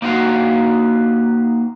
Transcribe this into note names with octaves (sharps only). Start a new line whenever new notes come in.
A#3 D#4 F#4 C5 F5